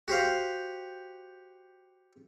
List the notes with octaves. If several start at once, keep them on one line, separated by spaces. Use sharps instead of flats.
F#4 G4 C5 F5